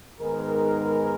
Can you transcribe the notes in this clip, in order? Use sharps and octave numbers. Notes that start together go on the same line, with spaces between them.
G#2 D#3 G#3 B3 G#4 A#4